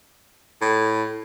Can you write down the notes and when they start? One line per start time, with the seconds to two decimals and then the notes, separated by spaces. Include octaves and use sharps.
0.62 A2